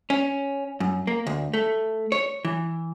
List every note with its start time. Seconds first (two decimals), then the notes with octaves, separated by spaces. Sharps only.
0.10 C#4
0.80 F#2
1.07 A#3
1.27 D2
1.54 A3
2.12 C#5
2.45 E3